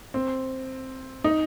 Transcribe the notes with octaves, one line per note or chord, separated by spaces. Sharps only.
C4
D#4